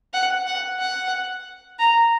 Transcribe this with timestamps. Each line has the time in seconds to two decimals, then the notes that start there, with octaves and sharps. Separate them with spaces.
0.13 F#5
0.47 F#5
0.79 F#5
1.79 A#5